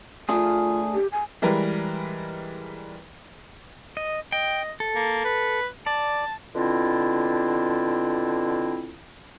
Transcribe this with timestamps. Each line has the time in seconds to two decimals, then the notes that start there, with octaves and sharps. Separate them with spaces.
0.29 A3 D4 F4 G#4
0.94 G4
1.12 G#5
1.42 E3 G3 G#3 A#4 B4
3.97 D#5
4.32 D#5 G5
4.80 A4
4.95 A#3
5.25 B4
5.87 D5 A5
6.55 B2 D3 C4 E4 F4